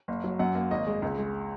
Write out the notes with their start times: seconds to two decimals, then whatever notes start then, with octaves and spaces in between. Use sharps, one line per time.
0.08 F#1
0.24 F#3
0.39 F#2 F#5
0.55 A#3
0.71 G#1 D#5
0.87 G#3
1.02 C#2
1.18 G#3